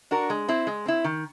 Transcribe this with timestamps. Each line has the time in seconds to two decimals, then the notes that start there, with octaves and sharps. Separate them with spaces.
0.11 D4 F#4 A#4
0.30 G#3
0.48 C4 E4
0.67 G#3
0.86 C4 E4
1.04 D#3